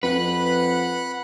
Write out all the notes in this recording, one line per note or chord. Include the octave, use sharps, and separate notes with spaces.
F2 B4 F#5 B5 F#6